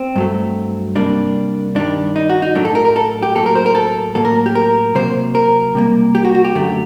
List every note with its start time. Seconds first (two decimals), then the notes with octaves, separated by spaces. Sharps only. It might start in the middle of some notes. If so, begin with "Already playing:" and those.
Already playing: C4
0.16 G2 F#3 A3
0.95 C3 G3 A#3 D4
1.75 G2 D#3 G3 D4
2.16 D#4
2.29 F#4
2.42 D#4
2.55 A2 F#3 A3 D4
2.65 A4
2.75 A#4
2.85 A#4
2.96 A4
3.23 G4
3.35 A2 F#3 A#3 A4
3.46 A#4
3.55 C5
3.66 A#4
3.75 A4
4.15 A2 F#3 A#3 A4
4.25 A#4
4.46 G4
4.55 A#4
4.95 C3 F#3 A#3 C5
5.35 A#4
5.75 C3 G3 A#3
6.15 G4
6.25 F#4
6.35 F#4
6.44 G4
6.55 F#2 D3 F#3 A3